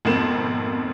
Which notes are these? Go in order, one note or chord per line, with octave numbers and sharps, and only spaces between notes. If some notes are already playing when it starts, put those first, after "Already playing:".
G#1 F2 B2 A#3 C4 E7